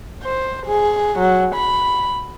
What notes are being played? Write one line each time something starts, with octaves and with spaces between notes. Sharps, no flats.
C5
G#4
F#3
B5